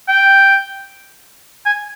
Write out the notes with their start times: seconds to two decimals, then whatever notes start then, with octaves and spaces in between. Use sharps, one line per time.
0.08 G5
1.66 G#5